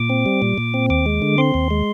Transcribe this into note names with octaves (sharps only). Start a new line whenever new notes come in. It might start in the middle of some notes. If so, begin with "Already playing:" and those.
Already playing: A#2 D6
C4
G3
A#2
A#2
C4
D#2 D6
G#3
D3
C4 C6
D#2
G#3